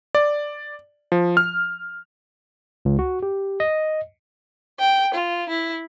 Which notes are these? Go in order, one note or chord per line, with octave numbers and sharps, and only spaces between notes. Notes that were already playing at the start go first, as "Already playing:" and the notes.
D5
F3
F6
C#2
F#4
G4
D#5
G5
F4
E4